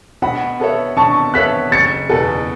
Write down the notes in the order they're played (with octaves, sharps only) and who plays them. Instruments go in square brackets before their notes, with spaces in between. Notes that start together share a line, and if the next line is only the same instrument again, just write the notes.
[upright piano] B2 [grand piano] F#5 B5
[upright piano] B3 A4 C#5 E5
[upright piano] B2 [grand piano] A5 C#6
[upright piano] B3 A4 C#5 E5 [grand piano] F#6 B6
[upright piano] F#1 [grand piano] A6 C#7
[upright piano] E2 B2 B3 A4